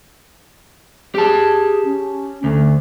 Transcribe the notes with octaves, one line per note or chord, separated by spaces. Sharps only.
G4 G#4 A5
C#4
D2 A3